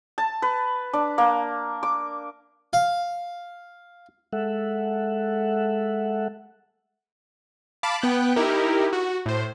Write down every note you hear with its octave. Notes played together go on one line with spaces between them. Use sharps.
A5
B4
D4
A#3
D6
F5
G#3 A4 E5 F#5
F5 A5 B5 D6
B3 G5 F#6
D#4 E4 G4 A#4
F#4
A2 C5